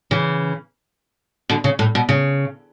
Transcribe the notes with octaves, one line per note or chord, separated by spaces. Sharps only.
C#3 E3
B2 D3
C#3
A2
B2
C#3